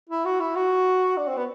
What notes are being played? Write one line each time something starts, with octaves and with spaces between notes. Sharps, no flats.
E4
F#4
E4
F#4
D4
C4
B3